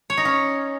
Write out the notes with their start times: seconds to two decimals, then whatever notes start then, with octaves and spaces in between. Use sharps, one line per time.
0.10 C#5
0.17 D#4
0.25 C#4